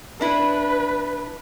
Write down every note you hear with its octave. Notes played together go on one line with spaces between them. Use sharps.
D4 E4 B4